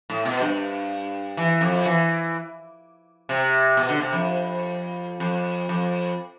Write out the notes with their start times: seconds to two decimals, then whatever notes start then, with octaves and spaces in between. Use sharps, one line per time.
0.10 A2
0.26 B2
0.41 G2
1.37 E3
1.61 F2
1.86 E3
3.29 C3
3.77 B2
3.89 D3
4.01 C3
4.13 F2
5.20 F2
5.69 F2